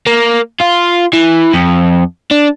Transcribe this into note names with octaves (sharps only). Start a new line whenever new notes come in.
A#3
F4
E3
F2
D4